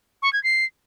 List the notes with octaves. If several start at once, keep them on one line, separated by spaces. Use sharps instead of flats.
C#6
G#6
C7